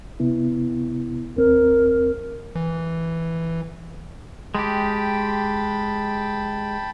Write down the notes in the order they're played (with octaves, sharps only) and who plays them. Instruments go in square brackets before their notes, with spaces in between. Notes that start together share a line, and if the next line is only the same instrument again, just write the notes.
[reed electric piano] C3 B3 E4
[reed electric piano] D#2 C4 [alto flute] A#4
[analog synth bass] E3
[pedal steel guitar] G#3 G4 [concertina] G5 A5 B5